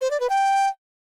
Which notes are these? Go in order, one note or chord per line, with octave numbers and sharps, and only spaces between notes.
C5
D5
B4
G5